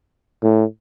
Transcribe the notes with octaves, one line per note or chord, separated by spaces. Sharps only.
A2